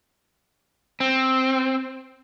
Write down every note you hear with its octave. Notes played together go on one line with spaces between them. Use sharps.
C4